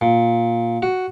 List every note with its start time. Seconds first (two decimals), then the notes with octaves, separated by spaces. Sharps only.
0.01 A#2
0.82 F#4